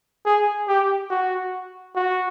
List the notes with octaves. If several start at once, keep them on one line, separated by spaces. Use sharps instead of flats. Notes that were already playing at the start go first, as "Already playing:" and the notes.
G#4
G4
F#4
F#4